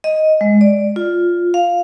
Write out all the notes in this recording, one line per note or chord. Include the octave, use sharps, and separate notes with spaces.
D#5
G#3
D5
F4
F5